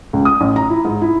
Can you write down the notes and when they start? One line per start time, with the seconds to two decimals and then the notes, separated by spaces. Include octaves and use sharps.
0.13 C#2
0.25 D#6
0.41 A1
0.56 A#5
0.70 E4
0.85 G#2
1.02 E4